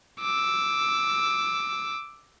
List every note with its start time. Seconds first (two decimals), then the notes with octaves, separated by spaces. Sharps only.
0.21 D6 E6